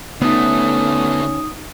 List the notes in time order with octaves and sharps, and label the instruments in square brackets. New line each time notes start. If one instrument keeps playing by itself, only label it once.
[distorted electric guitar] D2 A3 [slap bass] B3 [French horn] C#4 [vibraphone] D#4 D#6